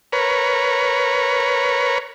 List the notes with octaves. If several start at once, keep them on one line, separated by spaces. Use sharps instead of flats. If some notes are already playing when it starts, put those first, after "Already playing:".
A#4 B4 C#5